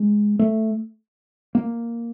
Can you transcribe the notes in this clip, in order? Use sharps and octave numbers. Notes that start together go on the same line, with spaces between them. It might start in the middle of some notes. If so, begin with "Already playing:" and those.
Already playing: G#3
A3
A#3